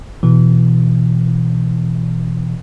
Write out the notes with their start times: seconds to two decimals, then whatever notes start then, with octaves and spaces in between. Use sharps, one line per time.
0.23 B2 E3